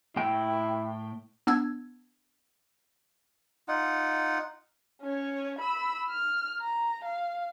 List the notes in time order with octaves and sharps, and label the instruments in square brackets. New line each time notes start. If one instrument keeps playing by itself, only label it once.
[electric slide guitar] A2 G5 [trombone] E4
[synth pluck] B3 D4 E6 G#6
[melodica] D#4 F4 F#5
[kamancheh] C#4 C#5
B5 E6
F6
A#5
F5